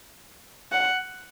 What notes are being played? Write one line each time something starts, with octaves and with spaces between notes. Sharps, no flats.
F#5